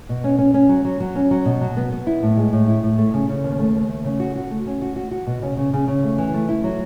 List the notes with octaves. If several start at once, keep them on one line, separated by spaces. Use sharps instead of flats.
B2
C#4
C#4
C#4
F#3
F#3
F#3
C#4
F#3
B2
F#3
B3
B3
E4
A2
G#3
A2
E4
A2
A3
C#3
C#3
D#2
A3
D#2
A3
C#3
F#4
F#4
A3
C#4
F#4
F#4
F#4
B2
C#3
C#3
C#3
C#3
A3
E3
A3
E4
F#3